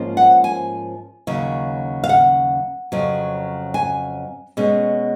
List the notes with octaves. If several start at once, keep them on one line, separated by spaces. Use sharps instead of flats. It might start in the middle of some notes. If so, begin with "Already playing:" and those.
Already playing: G#2 F3 A#3 C#4
F#5
G#5
D#2 C#3 F#3
F5
F#5
F2 C#3 F#3
G#5
B2 G#3 C#4